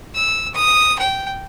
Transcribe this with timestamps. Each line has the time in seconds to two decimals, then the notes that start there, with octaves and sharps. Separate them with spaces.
0.15 E6
0.55 D#6
0.99 G5